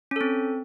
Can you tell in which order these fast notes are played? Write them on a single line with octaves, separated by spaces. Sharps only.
C#4 A4 C4